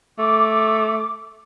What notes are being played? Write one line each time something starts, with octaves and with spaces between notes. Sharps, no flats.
A3 D6